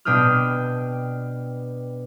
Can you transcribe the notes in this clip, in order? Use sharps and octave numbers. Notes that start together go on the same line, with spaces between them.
B2 D4 G5 D#6 F6